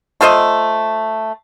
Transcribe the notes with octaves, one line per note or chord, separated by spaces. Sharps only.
A3 F4 C5 D#5